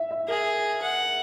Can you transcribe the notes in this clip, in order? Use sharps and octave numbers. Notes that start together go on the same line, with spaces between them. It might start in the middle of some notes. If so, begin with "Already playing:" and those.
Already playing: E5
E5
G#4 A#4
F#5